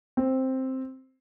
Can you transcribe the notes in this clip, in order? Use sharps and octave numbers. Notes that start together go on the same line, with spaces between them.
C4